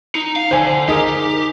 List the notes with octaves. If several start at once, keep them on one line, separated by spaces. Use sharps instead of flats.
D#4
F5
D3 C5 G#5
D#4 G4 G#4 A#4